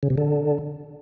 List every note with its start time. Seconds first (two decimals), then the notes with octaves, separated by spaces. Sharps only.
0.03 C#3
0.10 C3
0.18 D3